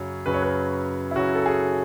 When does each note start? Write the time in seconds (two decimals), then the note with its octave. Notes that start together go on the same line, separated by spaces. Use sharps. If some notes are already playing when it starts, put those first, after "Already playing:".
Already playing: F#2 C#3 F#3 C#5
0.26 F#2 C#3 F#3 B4
0.34 C#5
0.42 B4
1.11 E4
1.16 F#2 C#3 F#3 F#4
1.35 A4
1.46 G#4